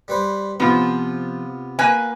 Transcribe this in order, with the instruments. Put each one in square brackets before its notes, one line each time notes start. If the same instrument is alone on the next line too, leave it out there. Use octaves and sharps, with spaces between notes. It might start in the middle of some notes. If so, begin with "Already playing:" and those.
[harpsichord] G3 B4 C5
[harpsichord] C3 [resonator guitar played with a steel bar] F3 [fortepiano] B3 F4
[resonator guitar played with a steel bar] A#3 B4 G#5